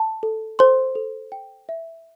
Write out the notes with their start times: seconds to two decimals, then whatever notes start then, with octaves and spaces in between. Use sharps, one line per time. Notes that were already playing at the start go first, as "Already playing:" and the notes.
Already playing: A5
0.23 A4
0.59 A4 C5 C6
0.95 A4
1.32 G5
1.69 E5